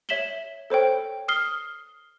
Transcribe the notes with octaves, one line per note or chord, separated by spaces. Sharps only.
C#5 E5 B6 E7 F#7 G7
A4 C5 C#5 G5
D#6 F6 C7 G7